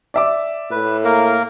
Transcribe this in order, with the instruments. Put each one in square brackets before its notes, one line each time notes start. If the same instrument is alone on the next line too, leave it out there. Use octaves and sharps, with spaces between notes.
[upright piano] D5 E5 D6
[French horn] A2 [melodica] B4
[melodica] A#3 A#4